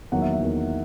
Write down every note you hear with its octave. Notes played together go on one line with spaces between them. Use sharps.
E2 D#3 F#3 A#3 F#5
E5
E5
E2 D#3 F#3 A#3